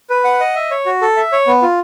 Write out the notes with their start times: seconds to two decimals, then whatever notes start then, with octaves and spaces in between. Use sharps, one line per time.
0.10 B4
0.24 F#5
0.40 D#5
0.56 E5
0.71 C#5
0.86 F#4
1.02 A4
1.17 E5
1.32 C#5
1.47 B3
1.62 F4